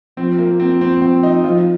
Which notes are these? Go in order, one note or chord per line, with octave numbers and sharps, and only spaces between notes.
F3 C4
A#3
C4
C4
C4
D#4
F3 F4